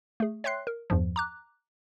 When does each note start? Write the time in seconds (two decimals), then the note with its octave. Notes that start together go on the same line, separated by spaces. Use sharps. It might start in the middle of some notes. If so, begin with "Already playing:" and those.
0.20 A3 G#4
0.44 C#5 E5 G5 C6 F#6 C7
0.67 A#4
0.90 E2 G2 F3
1.16 A#5 D6 F#6